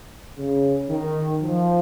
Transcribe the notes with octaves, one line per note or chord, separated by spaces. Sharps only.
C#3
D#3
F3